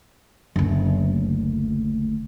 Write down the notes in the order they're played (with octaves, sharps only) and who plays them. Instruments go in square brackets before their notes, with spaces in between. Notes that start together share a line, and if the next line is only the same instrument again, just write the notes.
[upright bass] F#1 D2